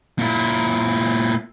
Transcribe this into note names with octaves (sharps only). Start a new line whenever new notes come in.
A#2 E4